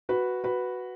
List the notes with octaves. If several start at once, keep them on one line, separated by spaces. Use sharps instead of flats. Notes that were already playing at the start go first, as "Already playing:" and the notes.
F#4 B4
F#4 B4